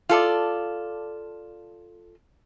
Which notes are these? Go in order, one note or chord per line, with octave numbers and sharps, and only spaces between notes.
F4 A4 D5